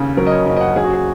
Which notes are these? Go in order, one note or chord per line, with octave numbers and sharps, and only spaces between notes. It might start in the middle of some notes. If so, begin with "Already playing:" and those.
Already playing: D#2 C#3
F#3 A#4
D#5
C#5
F#1 D#5
D#5
F#5
F#3 G#4
F#4
G#4